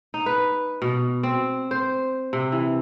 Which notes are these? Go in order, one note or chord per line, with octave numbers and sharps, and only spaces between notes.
D#4
B4
B2
C4
C5
C3
E3